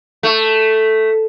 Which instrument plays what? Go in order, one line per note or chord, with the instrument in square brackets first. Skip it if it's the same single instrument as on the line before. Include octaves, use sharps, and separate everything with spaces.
[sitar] A3